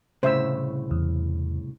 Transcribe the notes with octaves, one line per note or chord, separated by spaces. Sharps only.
C2 A2 C#3 C5 E5 E6
E2